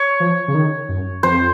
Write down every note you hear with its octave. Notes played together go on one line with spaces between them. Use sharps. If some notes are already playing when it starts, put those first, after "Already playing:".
Already playing: C#5
F3
C#3
D#3
F#2
F2 C5